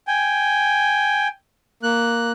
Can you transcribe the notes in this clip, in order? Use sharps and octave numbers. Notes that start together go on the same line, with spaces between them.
G5 G#5
A#3 F#6